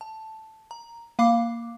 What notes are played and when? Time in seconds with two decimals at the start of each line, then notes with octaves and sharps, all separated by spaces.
0.01 A5
0.71 A#5
1.19 A#3 F5 B5 D6 C7